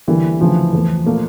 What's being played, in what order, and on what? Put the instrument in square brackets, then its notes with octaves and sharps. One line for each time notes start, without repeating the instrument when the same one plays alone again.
[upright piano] D2 D3 G3 A#3 [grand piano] E3
[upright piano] D2 C#3 E3 A3 [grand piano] F3
[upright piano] E2 E3 A3
[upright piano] A#2 A3 D4 F4 [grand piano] A#3